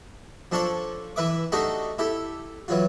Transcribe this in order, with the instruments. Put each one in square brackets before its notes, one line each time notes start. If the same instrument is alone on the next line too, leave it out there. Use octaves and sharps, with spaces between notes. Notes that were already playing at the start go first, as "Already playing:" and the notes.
[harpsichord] F3 D4 A4 C#5 D5
E3 B4 E5 D6
A3 D4 D#4 F#4 G4 A4
E4 G4 A4
E3 F#3 F4